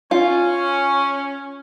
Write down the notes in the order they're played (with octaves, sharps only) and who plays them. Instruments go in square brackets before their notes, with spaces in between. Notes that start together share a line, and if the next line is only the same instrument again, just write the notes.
[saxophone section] C#4 [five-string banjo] F4